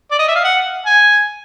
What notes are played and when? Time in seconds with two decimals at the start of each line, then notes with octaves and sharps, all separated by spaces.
0.11 D5
0.19 D#5
0.28 E5
0.35 F5
0.44 F#5
0.86 G#5